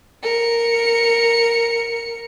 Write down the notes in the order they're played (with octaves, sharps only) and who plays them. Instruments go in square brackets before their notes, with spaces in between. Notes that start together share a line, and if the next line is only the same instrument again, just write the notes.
[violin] A#4 C#7